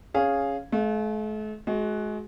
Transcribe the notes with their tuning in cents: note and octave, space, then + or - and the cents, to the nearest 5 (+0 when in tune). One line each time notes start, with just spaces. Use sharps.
C#4 +0 G#4 -5 F5 +0
A3 -45 F5 +0
G#3 +30 F#4 +0